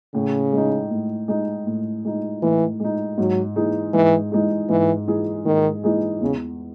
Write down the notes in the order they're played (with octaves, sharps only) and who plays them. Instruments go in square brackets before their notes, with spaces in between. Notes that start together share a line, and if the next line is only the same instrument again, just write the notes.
[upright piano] A2 [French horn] C#3
[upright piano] G#3 D#4
A2
G#3 D#4
A2
G#3 D#4
[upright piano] A2 [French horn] E3
[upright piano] G#3 D#4
[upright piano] G#2 [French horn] F#3
[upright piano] E3 G#3 D#4 G#4
[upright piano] G#2 [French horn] E3
[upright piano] E3 G#3 D#4 G#4
[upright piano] G#2 [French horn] E3
[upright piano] E3 G#3 D#4 G#4
[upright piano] G#2 [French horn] D#3
[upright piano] E3 G#3 D#4 G#4
[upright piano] E2 [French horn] C#3